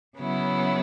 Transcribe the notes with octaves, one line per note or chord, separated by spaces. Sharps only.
C#3 F#3 B3 E4